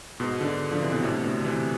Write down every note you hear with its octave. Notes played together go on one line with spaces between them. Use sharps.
G#2 B2
B2 D3
D3 F3
C3 E3
B2 D3
A2 C3
B2 D3
C3 E3